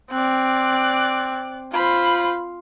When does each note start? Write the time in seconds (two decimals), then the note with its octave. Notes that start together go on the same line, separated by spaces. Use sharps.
0.12 C4 D5 F#6
1.73 F4 C5 B5